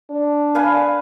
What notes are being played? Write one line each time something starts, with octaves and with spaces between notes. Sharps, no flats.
D4
B4 F5 G#5